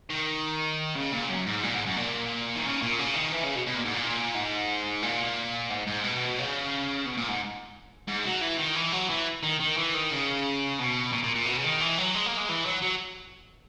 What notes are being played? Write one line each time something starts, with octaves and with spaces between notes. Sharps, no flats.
D#3
C#3
A#2
F#2
G#2
A#2
G#2
F#2
A#2
D#3
C#3
A#2
C#3
D#3
E3
C#3
B2
B2
A#2
G#2
A#2
G#2
A#2
G#2
G#2
B2
C#3
B2
A#2
G#2
G#2
F#3
E3
D#3
E3
F#3
E3
D#3
D#3
E3
D#3
C#3
B2
A#2
A#2
A#2
B2
C#3
D#3
E3
F#3
G#3
A#3
G#3
E3
F#3
F#3